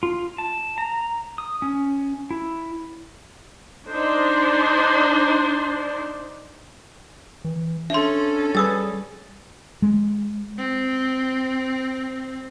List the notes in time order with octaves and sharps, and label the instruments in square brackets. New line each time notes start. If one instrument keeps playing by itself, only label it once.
[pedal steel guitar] F4
A5
A#5
D#6
C#4
E4
[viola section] D4 D#4 C5 C6
[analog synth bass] E3
[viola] C#4 A4 [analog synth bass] D4 [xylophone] E5 C6
[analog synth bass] G3 [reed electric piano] G4 G#4 B4 [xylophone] D#6 E6 A6
[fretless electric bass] G#3
[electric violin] C4